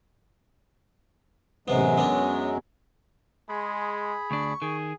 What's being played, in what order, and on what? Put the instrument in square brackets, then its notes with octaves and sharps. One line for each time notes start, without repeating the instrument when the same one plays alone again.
[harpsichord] A1 C3 B3 [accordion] F#2 F#3 G#3
[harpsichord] B3 C#4 D4
[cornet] G#3 [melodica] G#4 B5 [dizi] C6
[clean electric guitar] D2 D4 [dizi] C#6
[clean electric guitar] D#3 [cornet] G#4